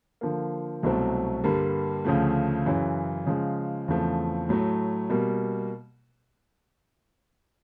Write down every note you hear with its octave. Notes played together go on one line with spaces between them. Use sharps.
D3 F3 A#3
C2 B2 F#3 A3 C4
G2 D3 G3 A#3
D2 C#3 F3 A3
F#2 C#3 E3
C#3 F3 G#3
E2 C#3 F3 A3 C4
A2 F#3 A3
B2 G3 A#3